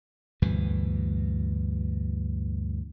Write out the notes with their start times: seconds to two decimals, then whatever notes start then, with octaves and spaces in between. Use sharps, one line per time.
0.42 D2 G2 B2 E3